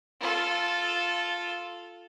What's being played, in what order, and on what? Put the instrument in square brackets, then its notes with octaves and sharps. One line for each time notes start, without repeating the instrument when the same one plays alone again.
[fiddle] F4 A4